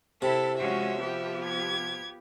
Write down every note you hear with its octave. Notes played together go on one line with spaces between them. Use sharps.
C3 E4 A4
F3 G#3 C#4 F#4 E5
F3 B3 G4
G#6